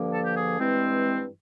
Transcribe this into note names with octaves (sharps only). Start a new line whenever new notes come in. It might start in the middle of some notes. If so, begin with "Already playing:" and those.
Already playing: G2 D3 F3 A#3
A4
G4
G#4
G2 E3 G#3 C4